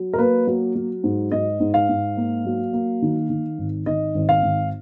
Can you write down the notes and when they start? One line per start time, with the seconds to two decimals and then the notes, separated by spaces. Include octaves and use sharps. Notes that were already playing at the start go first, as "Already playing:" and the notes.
Already playing: F#3
0.13 A#4
0.18 A#3 B4
0.47 F#3
0.75 F#3
1.04 G#2
1.32 G#2 D#5
1.60 G#2
1.74 F5
1.89 G#2
2.17 A#3
2.45 F#3
2.73 A#3
3.02 D#3
3.30 D#3
3.58 G#1
3.86 D#3 D#5
4.15 G#1
4.29 F5
4.43 G#1